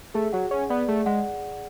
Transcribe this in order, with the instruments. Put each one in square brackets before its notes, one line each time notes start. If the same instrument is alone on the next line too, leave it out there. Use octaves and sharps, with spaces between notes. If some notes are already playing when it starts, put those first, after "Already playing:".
[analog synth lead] A3 [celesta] G#4
[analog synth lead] F#3 [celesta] F#5
[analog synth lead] C#4 [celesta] G#4
[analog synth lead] B3 [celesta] D5
[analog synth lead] A3 [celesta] G#4
[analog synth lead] G#3 [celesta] F#5